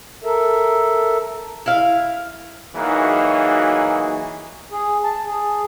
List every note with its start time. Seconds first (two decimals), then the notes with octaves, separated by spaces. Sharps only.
0.24 A4 A#4 E5
1.66 E4 F5
2.76 E3 F#3 A#3 D#4 F#4 G#4
4.72 G#4
5.04 A5
5.26 G#4